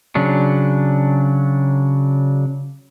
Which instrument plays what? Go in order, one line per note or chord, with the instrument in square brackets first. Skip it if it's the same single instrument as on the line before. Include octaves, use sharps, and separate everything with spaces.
[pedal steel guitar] C#3 F#3 D4